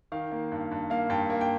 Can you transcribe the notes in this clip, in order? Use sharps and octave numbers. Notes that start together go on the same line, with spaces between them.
D#3 F5
A#3
G2
G2
A#3 F5
G2 G5
A#3
G5